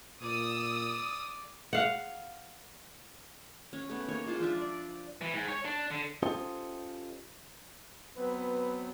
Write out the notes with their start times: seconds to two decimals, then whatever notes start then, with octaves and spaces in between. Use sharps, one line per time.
0.22 A#2 D5 D#6 E6
1.73 F5 F#5
3.73 C#4
3.90 A3 B3
4.09 A#3 D#4 C#5
4.26 G#3 F4 C5 A5
4.40 F3 D4 E5 A5
4.61 D5
5.22 E3
5.34 G#2
5.48 C#5
5.65 D4
5.91 D3
6.23 C#4 F4 G4 A4 C5 D#5
8.17 F#3 B3 C4 B4